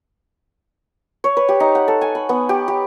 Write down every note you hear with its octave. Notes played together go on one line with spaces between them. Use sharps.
C#5
B4
G4
D#4
F#5
A4
G#5
B5
B3
G4
G4